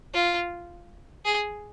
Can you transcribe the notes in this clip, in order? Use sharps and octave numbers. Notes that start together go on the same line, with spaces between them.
F4
G#4